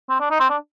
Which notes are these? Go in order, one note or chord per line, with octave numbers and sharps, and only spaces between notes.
C4
D4
D#4
C4
D4